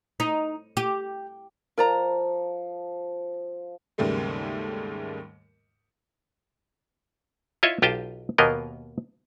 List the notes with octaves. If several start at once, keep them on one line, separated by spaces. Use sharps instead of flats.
D#4
G4
F3 A#4 D5 A#5
D#2 G#2 C#3 G3 A3 A#3
E4 F4 C#5 D#5 E5
B1 F4 G4 D#5 G5 A5
D#2 B2 A#3 B3 A#4 D#5